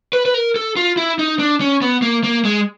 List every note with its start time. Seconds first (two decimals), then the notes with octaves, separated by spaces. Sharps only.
0.13 B4
0.26 B4
0.34 A#4
0.56 A4
0.76 F4
0.97 E4
1.19 D#4
1.39 D4
1.60 C#4
1.82 B3
2.02 A#3
2.24 A#3
2.45 G#3